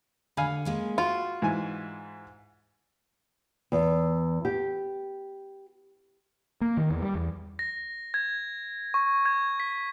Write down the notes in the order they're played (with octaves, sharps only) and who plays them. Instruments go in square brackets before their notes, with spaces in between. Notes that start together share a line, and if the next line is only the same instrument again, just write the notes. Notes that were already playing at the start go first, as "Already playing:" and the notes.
[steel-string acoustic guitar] D3 [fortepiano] F5 G#5 B5
[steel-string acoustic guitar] G#3 A#3 C#4
[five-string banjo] F4 [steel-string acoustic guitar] F#4
[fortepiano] G#2 E3 G#5
[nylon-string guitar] E2
G4
[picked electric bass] A#3
D#3
E2
G3
E2
[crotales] A#6
G#6
C#6
G#6
B6